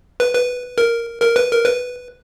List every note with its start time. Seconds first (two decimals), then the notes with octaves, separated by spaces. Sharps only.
0.20 B4
0.34 B4
0.78 A#4
1.22 A#4
1.36 B4
1.51 A#4
1.66 B4